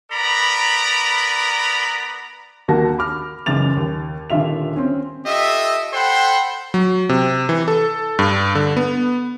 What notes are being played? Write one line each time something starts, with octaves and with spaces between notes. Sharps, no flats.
B3 A#4 D5 A#5 B5
D#2 D3 A#3 F#4 A5 A#6
B5 D6 F6
F#1 C#2 C#3 E3 A6 F7
D#2
D#1 D3 D#3 F4 E5 F7
C4 C#4
F4 G4 A4 D#5 E5
A4 C5 F#5 G5 B5 C6
F#3
C3
E3
A4
G2
D3
B3